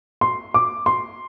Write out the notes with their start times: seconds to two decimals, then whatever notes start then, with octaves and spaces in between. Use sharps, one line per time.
0.21 C6
0.54 D6
0.86 C6